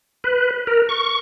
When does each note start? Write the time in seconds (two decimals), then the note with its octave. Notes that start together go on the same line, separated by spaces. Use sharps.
0.24 B4
0.67 A#4
0.89 C#6